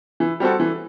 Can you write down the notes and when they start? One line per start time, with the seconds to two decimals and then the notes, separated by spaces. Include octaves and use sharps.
0.20 E3
0.40 G3 C4 F#4 A4
0.60 E3